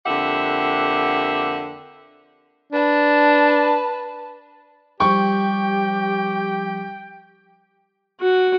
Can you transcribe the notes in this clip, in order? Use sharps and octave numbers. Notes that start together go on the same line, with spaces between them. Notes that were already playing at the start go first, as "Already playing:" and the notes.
F2 D3 A#3 G4 E5 F#5
D4 B4 A5
F3 G3 G4 G5 C#6
F#4